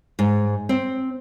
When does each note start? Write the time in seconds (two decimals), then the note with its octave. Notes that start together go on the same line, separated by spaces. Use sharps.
0.19 G#2
0.69 C4